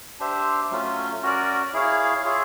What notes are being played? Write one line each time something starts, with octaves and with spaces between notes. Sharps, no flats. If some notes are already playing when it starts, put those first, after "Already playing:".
D4 G4 C5 E5
F#3 A3 C#4 F4
C#4 F#4 A#4 D5
E4 G#4 C#5 F5
F4 G#4 C#5 E5